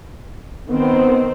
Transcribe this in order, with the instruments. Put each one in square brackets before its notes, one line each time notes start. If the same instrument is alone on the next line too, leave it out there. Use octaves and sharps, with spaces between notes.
[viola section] D#3 C4 [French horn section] B3